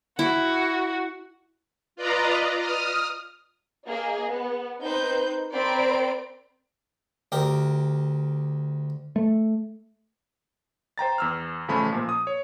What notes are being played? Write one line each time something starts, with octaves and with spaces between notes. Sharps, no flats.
E4 F#4
F4 B4 D5 D#5 A#5
D#6 F6
A#3 G#4 D#5
B3
C4 D#4 B4 C5 G6
C4 A#4 C5 D5 B5 D7
D2 G4 A#4
A3
C5 G5 A#5 A6
E2 E6 F6
A1 C#3 F3 A3 C#4 B5
A#2 F3 A#3
D#6
C#5